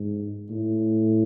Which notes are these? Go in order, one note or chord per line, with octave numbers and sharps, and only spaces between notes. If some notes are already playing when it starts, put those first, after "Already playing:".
Already playing: G#2
A2